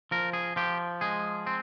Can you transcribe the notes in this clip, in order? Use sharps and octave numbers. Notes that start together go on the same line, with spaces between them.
F3 A#4
G#4
F3 G4
G#3 G#4
C4